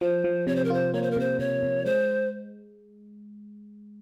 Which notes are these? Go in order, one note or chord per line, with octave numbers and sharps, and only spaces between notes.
F3 C5
F3
C3 C#5
C5
A#4
F4 C5
A#3 C#5
C5
A#4
C3 C5
C3 C#5
C3
G#3 C5